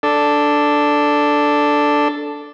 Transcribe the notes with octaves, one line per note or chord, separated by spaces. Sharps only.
D4 A4